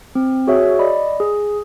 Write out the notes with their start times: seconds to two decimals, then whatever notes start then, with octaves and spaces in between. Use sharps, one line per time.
0.15 C4
0.47 F#4 G#4 C#5 E5
0.79 D5 D#5 B5
1.20 G#4